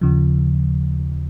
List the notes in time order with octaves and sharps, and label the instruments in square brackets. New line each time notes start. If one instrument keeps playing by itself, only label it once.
[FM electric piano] D#2 C#3 F3